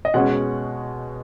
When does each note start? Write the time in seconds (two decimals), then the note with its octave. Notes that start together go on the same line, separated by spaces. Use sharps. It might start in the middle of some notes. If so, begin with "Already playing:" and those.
0.05 D#5
0.14 B2 G#3 C#4 F#5